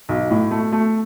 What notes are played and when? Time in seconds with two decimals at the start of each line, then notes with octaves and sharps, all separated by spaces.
0.09 B1
0.31 A2
0.51 A3
0.72 A3